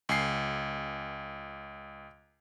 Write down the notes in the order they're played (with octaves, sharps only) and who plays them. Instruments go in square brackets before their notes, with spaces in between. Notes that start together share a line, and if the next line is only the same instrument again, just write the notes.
[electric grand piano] C#2 G#5 C7